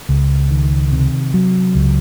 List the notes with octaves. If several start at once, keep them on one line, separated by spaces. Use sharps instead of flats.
C#2
D#3
C3
F#3
C#2